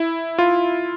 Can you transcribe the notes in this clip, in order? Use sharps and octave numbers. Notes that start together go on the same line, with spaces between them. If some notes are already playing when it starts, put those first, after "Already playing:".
Already playing: E4
F4